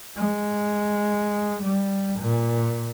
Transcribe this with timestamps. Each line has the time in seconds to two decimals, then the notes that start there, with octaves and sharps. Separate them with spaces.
0.17 G#3
1.63 G3
2.20 A#2